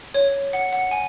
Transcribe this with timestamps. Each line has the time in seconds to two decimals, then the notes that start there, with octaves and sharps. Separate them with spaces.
0.14 C#5
0.53 F#5
0.73 F#5
0.91 G#5